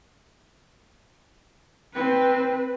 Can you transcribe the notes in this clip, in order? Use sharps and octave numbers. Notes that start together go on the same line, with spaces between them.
C4 B4